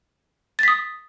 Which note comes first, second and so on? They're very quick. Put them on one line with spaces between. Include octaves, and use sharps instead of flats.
A6 B6 D#6